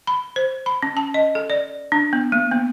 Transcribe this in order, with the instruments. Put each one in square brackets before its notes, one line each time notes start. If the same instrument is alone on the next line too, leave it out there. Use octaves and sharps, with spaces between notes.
[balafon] B5
C5
B5
C#4
A5
D#5
A4
D5
D4
B3
A#3
B3